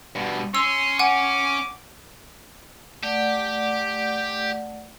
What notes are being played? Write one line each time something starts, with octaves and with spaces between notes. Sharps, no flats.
G2 B2
C#4 C6 E6
F#5 G#5 D6
A3 G4 D5 F#5